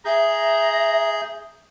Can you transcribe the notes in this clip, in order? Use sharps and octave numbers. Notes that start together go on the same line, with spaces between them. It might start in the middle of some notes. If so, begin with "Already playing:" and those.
G#4 E5 A#5 G6